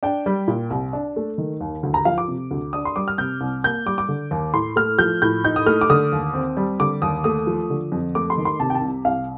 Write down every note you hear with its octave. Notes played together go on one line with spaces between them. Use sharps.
D4 G5
G3
A#2
C2
D4
A3
D#3
D#2
D2
A#5
F3 F5
D6
C3
D2
D4 D#6
C6
G3 D6
F6
C3 G6
C2
A#3 G6
G3 D6
D6
D3
D#2
A2 C6
A3 F6
F3 G6
A2 G6
D#4 G6
D#6
A3 F6
D6
D3 D#6
D#2
C4
G3
D3 D6
D#2 D#6
A3 D#6
F3
D3
F2
A3 D6
C6
D#3
C6
C3 A5
G5
A5
C2
C2 F5